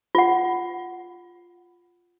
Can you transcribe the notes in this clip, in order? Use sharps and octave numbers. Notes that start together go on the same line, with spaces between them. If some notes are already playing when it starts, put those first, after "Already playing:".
F4 F#5